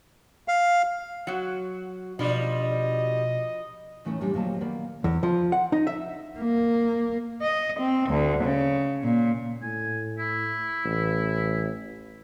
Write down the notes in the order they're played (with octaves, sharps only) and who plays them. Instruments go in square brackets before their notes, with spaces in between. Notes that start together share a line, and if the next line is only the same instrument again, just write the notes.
[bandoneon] F5
[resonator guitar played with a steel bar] F#3 F#4
[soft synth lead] B2 [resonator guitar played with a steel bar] F3 [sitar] G3 D4 D5 [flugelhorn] D#5
[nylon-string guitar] A2 E3 A3 C#4 D#4
A2 E3 G3 G#3 D4
D2 A#2 F3 F#3 D#5 A5
D#3 A#3 B3 D5
[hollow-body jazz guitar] E2
F3
F#5
D#4
E5
[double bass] A#3
[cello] D#5
C4
D2
C#3
A#2
[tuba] A2 [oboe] G#5
[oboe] E4
[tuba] A1